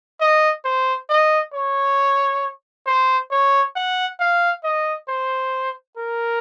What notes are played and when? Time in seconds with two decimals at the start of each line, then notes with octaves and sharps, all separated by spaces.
0.21 D#5
0.65 C5
1.10 D#5
1.54 C#5
2.87 C5
3.31 C#5
3.76 F#5
4.20 F5
4.64 D#5
5.09 C5
5.98 A#4